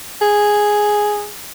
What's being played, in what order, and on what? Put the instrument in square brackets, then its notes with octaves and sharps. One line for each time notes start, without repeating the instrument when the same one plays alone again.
[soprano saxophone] G#4